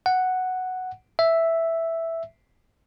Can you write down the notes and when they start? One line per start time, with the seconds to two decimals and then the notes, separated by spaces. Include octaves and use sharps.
0.06 F#5
1.19 E5